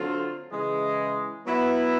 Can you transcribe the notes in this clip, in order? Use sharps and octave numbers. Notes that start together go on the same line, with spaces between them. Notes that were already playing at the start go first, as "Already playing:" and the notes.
Already playing: D3 F#3 A3 C4 F4
C#3 E3 G#3
F#3 B3 E4